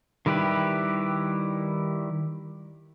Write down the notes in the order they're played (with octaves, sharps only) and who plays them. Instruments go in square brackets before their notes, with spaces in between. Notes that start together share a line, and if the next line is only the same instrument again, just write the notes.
[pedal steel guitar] D#3 G3 E4 G4 B4